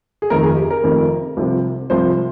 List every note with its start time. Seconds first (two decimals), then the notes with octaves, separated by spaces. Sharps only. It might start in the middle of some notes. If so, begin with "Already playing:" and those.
0.22 G#4
0.30 F1 F2 D#3 A#4
0.43 G#4
0.57 G4
0.71 A#4
0.84 F1 F2 D#3
1.37 C2 C3 F3
1.90 C2 C3 F3 C5